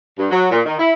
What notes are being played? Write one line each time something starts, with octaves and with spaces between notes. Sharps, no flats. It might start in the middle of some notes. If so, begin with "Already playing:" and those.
G2
F#3
A#2
D#3
E4